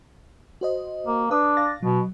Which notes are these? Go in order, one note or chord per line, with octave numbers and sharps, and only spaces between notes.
F#4 C5 D#5
A#3
D4 B4 D#6
F5 A6 A#6
B2 F#3